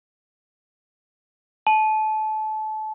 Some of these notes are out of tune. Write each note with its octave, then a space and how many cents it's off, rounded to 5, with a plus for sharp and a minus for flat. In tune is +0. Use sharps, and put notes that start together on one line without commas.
A5 -25